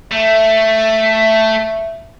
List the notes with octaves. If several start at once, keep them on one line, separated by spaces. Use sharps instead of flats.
A3 E5